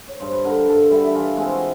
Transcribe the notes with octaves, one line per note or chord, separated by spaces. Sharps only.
C#5
G2 C5
B4
D3 G3 A#4
G2 A4
D3 G3 E4
E4
E3 F4
G#3 C4 E4
F#4